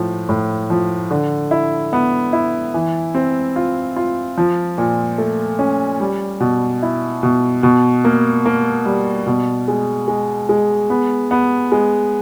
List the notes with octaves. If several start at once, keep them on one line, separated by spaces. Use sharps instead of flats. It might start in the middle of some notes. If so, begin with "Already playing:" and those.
Already playing: A2 F3
A2
F3
D3
E4
B3
E4
E3
C4
F4
F4
F3
A#2
A3
C#4
G3
B2
E4
B2
B2
A#3
A#3
G3
B2
G#3
G#3
G#3
B3
B3
G#3